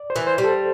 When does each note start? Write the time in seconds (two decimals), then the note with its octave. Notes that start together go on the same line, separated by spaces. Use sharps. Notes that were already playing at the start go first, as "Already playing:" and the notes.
Already playing: D5
0.10 C5
0.16 E3
0.27 C5
0.38 G3
0.44 A4